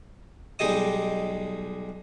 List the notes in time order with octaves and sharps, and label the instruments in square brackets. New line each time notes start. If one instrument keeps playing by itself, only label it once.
[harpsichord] B1 G3 G#3 G4 D#5 D#6